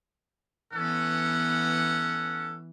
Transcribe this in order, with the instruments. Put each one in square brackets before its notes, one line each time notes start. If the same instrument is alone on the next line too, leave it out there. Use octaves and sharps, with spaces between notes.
[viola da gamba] E3 B3 [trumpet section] C#4 A4 F#5